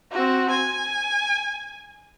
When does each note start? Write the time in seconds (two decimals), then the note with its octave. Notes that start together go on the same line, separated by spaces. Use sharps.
0.12 C4 F#4
0.50 G#5